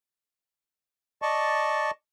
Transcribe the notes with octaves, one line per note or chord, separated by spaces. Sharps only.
D5 D#5 A5 C#6